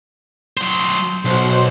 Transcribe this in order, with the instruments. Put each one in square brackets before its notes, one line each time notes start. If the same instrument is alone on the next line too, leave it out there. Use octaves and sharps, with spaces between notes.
[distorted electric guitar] F#3 C5
[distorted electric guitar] B1 [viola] F#4 C5